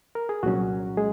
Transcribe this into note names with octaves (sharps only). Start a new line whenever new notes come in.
A#4
G#4
C2 A#2 F#3 C#4 F#4
G#3 G#4